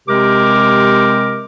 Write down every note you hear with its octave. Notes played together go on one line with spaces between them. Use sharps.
C3 G#3 C4 G4 A#4 D6